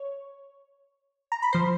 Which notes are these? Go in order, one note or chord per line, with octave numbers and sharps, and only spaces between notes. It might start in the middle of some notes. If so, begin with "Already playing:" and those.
Already playing: C#5
A#5
B5
F3 C5 C6